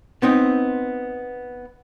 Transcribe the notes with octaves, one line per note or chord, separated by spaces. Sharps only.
B3 C4 D#4